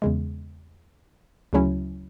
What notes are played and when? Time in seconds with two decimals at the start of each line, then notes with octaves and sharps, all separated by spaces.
0.02 E2 C#3 G#3
1.53 D2 C#3 F#3 C#4 E4